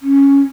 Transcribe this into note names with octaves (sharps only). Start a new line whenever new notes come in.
C#4